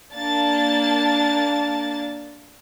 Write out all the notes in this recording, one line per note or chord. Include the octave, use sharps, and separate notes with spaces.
A#3 D4 A5 A6